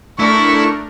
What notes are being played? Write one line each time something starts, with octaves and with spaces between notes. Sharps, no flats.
A3 D4 E4 A#4 C#6